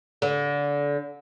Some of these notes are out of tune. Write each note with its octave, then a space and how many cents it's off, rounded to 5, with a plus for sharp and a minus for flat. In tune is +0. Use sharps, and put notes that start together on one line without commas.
D3 -25